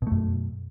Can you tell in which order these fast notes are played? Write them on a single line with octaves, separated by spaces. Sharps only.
B2 A3 F#2